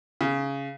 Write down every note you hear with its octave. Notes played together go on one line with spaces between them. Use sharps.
C#3